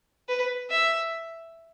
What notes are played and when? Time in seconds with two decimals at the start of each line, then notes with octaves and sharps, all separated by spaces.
0.28 B4
0.70 E5